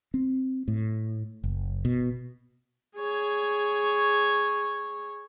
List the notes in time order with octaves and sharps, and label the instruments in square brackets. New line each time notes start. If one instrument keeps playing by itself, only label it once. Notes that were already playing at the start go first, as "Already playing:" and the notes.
[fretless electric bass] C4
A2
F#1
B2
[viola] G#4 C#5